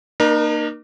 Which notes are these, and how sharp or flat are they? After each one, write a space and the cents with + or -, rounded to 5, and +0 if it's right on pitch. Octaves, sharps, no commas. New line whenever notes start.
A#3 +0 D#4 -40 A#4 +35